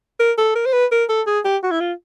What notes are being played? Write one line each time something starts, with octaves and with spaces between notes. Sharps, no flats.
A#4
A4
A#4
C5
B4
A#4
A4
G#4
G4
F#4
E4
F4